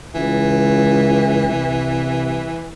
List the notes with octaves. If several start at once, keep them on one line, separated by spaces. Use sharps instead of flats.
C#2 E3
C2